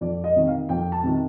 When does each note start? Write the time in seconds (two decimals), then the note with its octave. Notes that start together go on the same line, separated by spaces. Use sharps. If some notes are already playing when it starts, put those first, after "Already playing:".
0.01 F2 D5
0.24 D#5
0.36 C3 D#3
0.47 F5
0.69 F2 G5
0.92 A5
1.04 C3 D#3